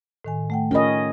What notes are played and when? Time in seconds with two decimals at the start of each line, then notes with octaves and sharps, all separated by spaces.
0.24 A2 D#3 G#5
0.50 A3 F#5 G5
0.71 C#4 F4 A#4 D#5 B5